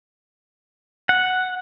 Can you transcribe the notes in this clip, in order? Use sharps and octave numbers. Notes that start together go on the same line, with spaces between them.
F#5